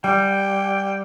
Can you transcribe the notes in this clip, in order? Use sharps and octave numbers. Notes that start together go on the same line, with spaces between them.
G3 G5